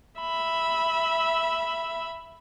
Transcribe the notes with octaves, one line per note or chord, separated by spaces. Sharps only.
E5 B5